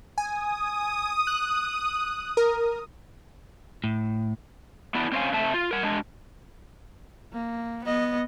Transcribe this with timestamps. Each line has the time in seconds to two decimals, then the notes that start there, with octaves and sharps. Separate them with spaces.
0.18 G#5 D#6
1.27 F#6
2.37 A#4
3.84 A2
4.95 B3 D4 E4
5.12 C4 C#4 C5 D5 F5 G#5
5.32 C3 A3 E5 A5
5.54 F4
5.71 A#4 F#5
5.83 G#3 D4
7.33 A#3
7.85 B3 D#5